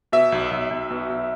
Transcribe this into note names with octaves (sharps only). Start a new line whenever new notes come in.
B2 E5
B1
B1
B1
B2
B1